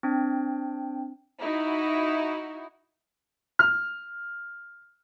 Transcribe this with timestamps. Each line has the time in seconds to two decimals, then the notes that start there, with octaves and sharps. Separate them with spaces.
0.03 C4 D4 G5
1.40 D#4 E4 F#4
3.59 F6